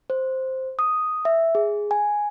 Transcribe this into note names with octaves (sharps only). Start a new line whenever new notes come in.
C5
D#6
E5
G#4
G#5